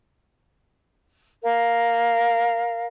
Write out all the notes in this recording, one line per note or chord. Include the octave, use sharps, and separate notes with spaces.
A#4 F5